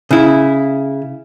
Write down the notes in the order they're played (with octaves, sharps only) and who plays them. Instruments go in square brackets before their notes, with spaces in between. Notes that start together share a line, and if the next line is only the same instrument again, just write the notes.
[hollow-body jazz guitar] C#3 E4